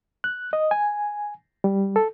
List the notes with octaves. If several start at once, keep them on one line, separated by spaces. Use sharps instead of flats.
F#6
D#5
G#5
G3
A4